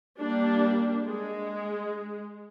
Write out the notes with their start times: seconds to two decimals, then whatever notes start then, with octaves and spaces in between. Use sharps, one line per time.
0.20 G3 A#3 D4
1.05 G#3